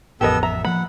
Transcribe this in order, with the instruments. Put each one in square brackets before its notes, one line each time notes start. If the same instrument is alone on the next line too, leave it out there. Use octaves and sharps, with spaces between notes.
[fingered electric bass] A1 F2 [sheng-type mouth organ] B3 A4 E6 [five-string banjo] G4 A#4 D#5
[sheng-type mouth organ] E5 [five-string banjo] A#5
[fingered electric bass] F3 A#3 [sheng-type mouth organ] F#5 [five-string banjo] B5